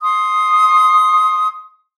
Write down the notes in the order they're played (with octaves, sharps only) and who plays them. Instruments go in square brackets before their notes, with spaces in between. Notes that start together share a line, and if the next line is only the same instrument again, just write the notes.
[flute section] C6 D#6